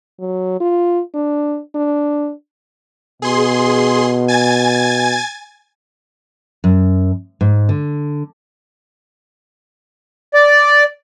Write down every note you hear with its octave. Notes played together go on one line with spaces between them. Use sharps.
F#3
F4
D4
D4
B2 G#4 C6
G#5 G#6 A6
F#2
G#2
D3
D5